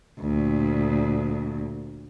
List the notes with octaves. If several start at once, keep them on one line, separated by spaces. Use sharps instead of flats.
D2 A#2